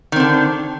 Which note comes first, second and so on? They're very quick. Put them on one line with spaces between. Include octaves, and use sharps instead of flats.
D#3 C4 D3